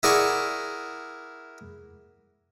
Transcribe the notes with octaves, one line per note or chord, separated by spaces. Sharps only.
E4 G#4 A#4 D5 F#5 C#6